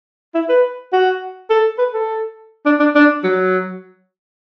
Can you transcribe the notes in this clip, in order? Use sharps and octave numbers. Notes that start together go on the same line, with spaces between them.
E4
B4
F#4
A4
B4
A4
D4
D4
D4
F#3